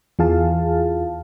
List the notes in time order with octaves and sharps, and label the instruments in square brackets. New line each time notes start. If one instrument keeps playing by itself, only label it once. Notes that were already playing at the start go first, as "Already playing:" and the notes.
[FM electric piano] E2 E3 F4 G#4 F5 A5